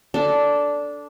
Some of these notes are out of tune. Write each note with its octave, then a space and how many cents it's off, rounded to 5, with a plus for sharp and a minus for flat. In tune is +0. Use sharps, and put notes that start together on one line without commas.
D4 -10 A4 +0